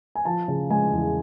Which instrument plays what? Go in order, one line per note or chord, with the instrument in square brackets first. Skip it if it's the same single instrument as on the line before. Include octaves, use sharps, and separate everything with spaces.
[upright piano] G#5
F3 A5
C#3
G#3 G#5
E2